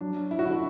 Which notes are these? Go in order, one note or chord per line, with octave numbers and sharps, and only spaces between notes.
F#3 D4
E4
F#4
D3 E4